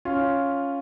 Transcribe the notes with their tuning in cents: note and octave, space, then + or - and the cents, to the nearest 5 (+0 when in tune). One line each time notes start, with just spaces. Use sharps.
C#4 +0 F4 +0